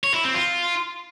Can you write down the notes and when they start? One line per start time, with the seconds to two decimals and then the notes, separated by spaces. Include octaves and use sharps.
0.04 C#5
0.14 E4
0.24 C4
0.34 F4